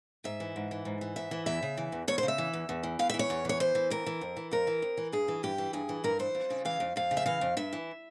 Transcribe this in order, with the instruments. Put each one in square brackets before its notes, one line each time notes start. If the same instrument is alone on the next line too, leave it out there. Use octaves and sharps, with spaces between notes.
[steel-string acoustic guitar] G#2 E5
E3
G#2
E3
G#2
E3
G#2 E5
E3
E2 E5
C#3
E3
E2
E2 C#5
C5
C#3
E5
E3
E2
E2
E3
E2 F5
E5
E3
C#5
E2
E3 C#5
E2 C5
E3
F2 A#4
E3
F2
E3
F2 A#4
E3
F2
E3
G2 G#4
E3
G2 G4
E3
G2 G#4
E3
G2 A#4
E3 C5
F2
C#3
E3 F5
F2
F2 F5
C#3
E5
E3 F5
F2
G2 E5
E3